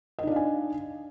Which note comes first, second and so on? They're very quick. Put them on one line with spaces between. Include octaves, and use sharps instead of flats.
D#5 D#4 D4 F5 G#5